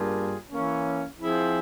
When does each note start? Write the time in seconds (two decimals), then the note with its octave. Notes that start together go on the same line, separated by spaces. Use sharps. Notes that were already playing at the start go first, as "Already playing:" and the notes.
Already playing: G2 G3 A#3 F4 G#4
0.50 E3 A#3 C#4
1.19 F3 C4 E4 G#4